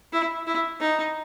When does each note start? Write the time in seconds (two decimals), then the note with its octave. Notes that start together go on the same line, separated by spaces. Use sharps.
0.13 E4
0.47 E4
0.80 D#4